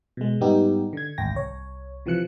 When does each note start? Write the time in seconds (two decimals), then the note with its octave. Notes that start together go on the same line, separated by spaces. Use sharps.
0.17 B2 G#3
0.41 G#2 G3 B3 D#4 G4
0.93 D3 G#6
1.18 G#1 D2 G5 A#6
1.35 C2 C#5
2.06 C3 E3 F3 F#6 C#7